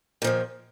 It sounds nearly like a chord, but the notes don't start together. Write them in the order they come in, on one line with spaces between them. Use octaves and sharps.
A#2 F3 D#3